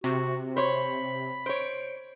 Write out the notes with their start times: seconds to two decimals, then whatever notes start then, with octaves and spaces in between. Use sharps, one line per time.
0.04 C3 F#4
0.57 C5 C#5 B5
1.46 C5 C#5 D7